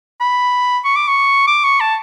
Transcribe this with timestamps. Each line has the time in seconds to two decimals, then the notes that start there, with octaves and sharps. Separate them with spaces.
0.21 B5
0.84 C#6
0.96 D6
1.08 C#6
1.47 D6
1.64 C#6
1.80 A5